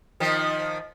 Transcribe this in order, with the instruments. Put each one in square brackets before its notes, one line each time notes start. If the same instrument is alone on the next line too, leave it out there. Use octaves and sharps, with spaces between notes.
[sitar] D#3 F3